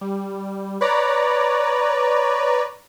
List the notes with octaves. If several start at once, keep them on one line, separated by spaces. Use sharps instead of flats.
G3
B4 C#5 D5 A#5